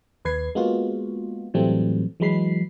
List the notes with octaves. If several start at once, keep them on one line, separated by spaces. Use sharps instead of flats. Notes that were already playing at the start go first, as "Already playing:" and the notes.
D#2 B4 G#6 C7
G#3 A#3 B3 F4 F#4
A2 E3 F#3 G3 A3 C4
E3 F#3 G#3 B5 C7